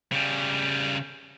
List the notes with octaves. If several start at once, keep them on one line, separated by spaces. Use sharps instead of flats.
C#3 G3